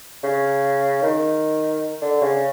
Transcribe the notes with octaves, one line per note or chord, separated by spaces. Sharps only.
C#3
D#3
D3
C#3